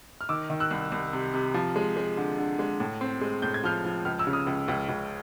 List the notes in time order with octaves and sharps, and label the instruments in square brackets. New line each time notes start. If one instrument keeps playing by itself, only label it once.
[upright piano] F6
D#3 D6 E6
D#3
E6 F#6
C2
C2
C3
C3
F3
G#3
G#3
D3
D3
G#3
A2
C4
G#3
A2 G6
G#6
F3 F6 G6
F3
C#2 F6
E6
C#3
D#6 F6
C#2
C#2
C#2